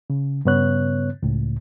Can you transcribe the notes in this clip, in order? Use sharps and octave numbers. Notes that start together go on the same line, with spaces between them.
C#3
G2 C#3 B3 C#5 F#6
C#2 A2